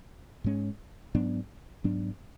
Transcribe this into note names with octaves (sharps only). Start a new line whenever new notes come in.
G#2 G#3 C#4
G#2 F#3 B3 D4
G#2 F#3 B3 D4